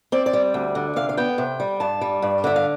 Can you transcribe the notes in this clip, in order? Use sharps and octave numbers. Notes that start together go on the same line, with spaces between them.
C4 D5
D5
G3
D2
D3
C3 F5
F5
B3 G5
C3
G3
G2 A5
G3
G2
D3 E5
F5